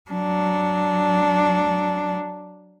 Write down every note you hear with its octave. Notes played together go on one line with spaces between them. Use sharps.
F#3 D4